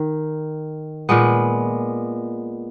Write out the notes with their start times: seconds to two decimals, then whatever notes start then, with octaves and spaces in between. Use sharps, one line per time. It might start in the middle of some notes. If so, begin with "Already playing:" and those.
Already playing: D#3
1.09 A#2 G#3 B3